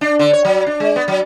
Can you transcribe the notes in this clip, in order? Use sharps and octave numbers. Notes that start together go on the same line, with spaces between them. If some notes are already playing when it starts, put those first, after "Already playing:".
D4
D3
C#5
F#3
D4
G#3
B3
F#3